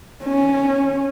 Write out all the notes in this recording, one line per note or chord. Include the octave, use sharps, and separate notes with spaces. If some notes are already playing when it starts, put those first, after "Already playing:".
C#4